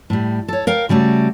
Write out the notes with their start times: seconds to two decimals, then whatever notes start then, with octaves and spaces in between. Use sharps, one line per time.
0.10 A2 G3
0.48 A4 C#5
0.67 A#4 F5 G5
0.89 C#3 G3 A3 F#4